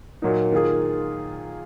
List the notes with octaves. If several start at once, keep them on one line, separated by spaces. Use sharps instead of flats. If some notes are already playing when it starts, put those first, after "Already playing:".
A#2 F#3 A#3 D#4
D#3 A#3 F4 G#4